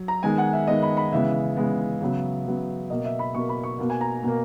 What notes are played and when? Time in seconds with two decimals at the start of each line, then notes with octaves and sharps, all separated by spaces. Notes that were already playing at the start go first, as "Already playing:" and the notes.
Already playing: F#3
0.08 A#5
0.23 D#3 G#3 B3 G#5
0.38 F#5
0.53 E5
0.67 D#3 G#3 B3 D#5
0.82 B5
0.97 B5
1.12 C#3 E3 G#3 B3 E5
1.56 C#3 E3 G#3 B3
2.01 C#3 F#3 B3
2.45 C#3 F#3 B3
2.90 B2 A#3 D#5
3.05 E5
3.19 B5
3.34 B2 A#3 C#6
3.49 B5
3.63 C#6
3.79 B2 A#3
3.90 G#5
4.01 A#5
4.23 B2 A#3